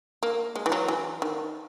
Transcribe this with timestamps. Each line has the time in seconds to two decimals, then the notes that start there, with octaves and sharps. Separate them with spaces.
0.23 A#3
0.56 G#3
0.66 E3
0.72 F#3
0.88 E3
1.22 D#3